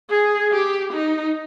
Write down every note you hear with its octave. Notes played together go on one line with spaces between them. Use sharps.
G#4
G4
D#4